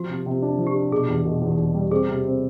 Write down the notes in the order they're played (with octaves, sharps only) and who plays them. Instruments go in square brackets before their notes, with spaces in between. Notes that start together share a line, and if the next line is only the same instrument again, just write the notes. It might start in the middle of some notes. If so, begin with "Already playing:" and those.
Already playing: [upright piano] F3 [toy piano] F#4
[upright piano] C3
C3
D4
F3
[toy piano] G4
[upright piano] D4
[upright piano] B2 [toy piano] G#4
[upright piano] E2
B2
E2
E2
G3
[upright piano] C4 [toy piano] G#4
[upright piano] C3
C4